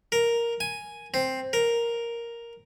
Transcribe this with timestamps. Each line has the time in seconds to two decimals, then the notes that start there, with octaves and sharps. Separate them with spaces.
0.12 A#4
0.60 G#5
1.14 C4
1.53 A#4